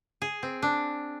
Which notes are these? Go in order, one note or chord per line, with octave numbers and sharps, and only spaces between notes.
G#4
C4
D4